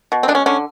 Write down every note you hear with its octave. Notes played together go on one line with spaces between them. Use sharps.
B2
C4
G#3 D4
C#4
D3 C#4